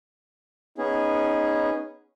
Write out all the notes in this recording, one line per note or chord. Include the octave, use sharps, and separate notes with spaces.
B3 C#4 D#4 G#4